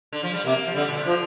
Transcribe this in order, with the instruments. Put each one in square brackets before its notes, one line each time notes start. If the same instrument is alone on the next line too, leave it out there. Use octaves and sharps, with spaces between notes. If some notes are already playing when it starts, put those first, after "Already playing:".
[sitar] D3
F3
G3
[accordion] C3 [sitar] A#3
[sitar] F3
[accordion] D3 [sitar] G3
[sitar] A#2
C3
[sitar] D3 [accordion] F3